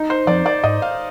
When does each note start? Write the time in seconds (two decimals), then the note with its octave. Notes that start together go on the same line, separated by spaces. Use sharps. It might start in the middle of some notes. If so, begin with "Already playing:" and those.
Already playing: D#4
0.10 C5
0.27 F3 C4 D5
0.46 D5
0.64 G#2 D#5
0.82 F5